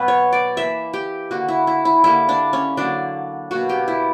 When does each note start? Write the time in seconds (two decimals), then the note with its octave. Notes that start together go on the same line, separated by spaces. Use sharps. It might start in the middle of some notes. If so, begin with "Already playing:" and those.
Already playing: B2 F#3 B3 B4
0.08 C#5
0.33 D5
0.57 E3 A#3 E5
0.94 G4
1.31 D3 A#3 F#4
1.48 E4
1.67 E4
1.85 E4
2.04 D3 G3 A#3 E4
2.29 D4
2.53 C#4
2.77 D3 F#3 A#3 D4
3.51 B2 A#3 F#4
3.69 G4
3.88 E4